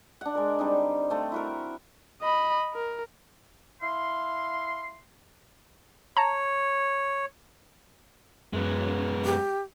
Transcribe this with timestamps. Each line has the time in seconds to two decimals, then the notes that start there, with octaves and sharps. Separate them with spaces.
0.21 D4 F#5
0.35 G#3 A#4
0.59 D3 G3 C4 D#4
1.10 A3 C4
1.32 E4 F#4 A#4
2.22 D#5 B5
2.74 A#4
3.82 E4 F5 C6
6.17 C#5 A5 A#5
8.53 F#2 G#3 B3
9.25 G4